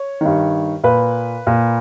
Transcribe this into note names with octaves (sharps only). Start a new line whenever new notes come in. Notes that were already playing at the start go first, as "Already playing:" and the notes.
Already playing: C#5
G2 D#3
A#2 B4
A#2